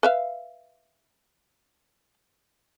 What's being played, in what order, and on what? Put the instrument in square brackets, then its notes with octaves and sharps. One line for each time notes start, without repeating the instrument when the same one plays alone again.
[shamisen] B4 E5 F5